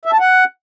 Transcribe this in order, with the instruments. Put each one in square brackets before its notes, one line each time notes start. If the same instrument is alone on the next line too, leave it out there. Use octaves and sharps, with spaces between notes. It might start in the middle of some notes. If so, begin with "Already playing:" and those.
[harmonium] E5
A5
F#5